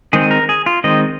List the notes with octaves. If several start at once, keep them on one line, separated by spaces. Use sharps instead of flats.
D#3 G#3 C4 G#4
A#4
G#4
F4
D#3 G#3 C4 D#5